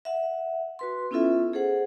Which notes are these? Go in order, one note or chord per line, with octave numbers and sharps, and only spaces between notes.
E5 F#5
F#4 B4 C6
B3 C#4 E4 F4 A4 E5
G#4 A4 C5 F#5